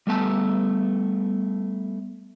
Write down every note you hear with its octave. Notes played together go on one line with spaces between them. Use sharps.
G3 A3 B3 A5